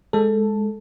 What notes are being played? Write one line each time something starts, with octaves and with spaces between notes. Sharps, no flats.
G#3 A4